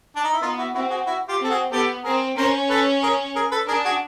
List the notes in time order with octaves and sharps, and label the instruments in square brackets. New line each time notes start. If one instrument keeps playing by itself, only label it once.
[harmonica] D4
D#4
E4
[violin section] B3 [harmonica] D#4 F4
[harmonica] E4 F#4
[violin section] C4 [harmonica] E4 F#4
[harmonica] F#4 G#4
E4 F#4
F4 G4
[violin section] C4
[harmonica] A4
F#4 G#4
[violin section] B3 [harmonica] G4 A4
[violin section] C4 [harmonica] G#4 A#4
[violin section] C#4 [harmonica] A#4 C5
[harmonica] A4 B4
G#4 A#4
G#4 A#4
A4 B4
[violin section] D4 [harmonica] G#4 A#4
[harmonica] F#4 G#4